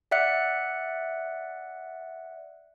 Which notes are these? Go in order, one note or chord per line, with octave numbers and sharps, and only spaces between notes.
D5 E5 F#5 F#6 C#7